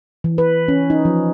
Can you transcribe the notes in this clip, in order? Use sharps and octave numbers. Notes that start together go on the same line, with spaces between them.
E3
B4
C#4
D#4
F3